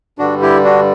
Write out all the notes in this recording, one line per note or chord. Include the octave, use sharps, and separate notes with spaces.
G2 D3 G3 D4 F#4
E4 G4
D4 F#4